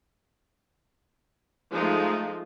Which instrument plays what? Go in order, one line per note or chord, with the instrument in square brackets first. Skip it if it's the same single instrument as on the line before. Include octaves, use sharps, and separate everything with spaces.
[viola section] F3 G#3 A3 D#4 F4